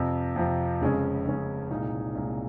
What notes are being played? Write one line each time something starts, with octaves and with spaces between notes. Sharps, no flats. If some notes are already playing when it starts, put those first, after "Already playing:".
Already playing: F2 C3 F3
F2 C3 F3
F1 F2 C#3 G#3 C#4
F1 F2 C#3 G#3 C#4
C2 A#2 G#3 D#4
C2 A#2 G#3 D#4